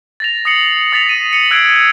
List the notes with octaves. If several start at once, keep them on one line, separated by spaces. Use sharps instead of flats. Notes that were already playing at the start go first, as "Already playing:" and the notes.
A6 A#6 F7
D#6 A#6 C7 C#7 F#7
D#6 A6 B6 F7
D#7
C#7 F#7
E6 F#6 G#6 C7 D7